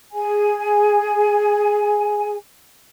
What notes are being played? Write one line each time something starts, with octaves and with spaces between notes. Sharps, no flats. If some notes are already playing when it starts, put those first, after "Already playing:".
G#4 G#5